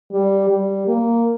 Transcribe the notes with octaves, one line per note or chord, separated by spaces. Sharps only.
G3
G3
A#3